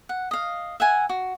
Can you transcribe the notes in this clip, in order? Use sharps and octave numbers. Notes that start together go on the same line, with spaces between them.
F#5
D#5 F5
E5 F#5 G#5
F#4